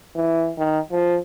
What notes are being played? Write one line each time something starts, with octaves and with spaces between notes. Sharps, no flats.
E3
D#3
F3